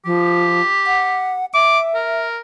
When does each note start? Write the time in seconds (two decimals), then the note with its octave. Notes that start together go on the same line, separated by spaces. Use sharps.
0.05 F3 G4
0.87 F#5
1.54 E5 D6
1.95 A#4